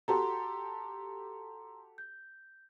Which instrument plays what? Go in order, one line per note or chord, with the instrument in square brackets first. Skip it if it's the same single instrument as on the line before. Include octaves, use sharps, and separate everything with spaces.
[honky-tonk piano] F#4 G4 A4 [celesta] A#5 C6
[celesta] G6